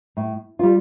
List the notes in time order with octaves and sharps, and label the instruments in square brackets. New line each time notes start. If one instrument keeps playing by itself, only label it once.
[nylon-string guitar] A2
G3 F4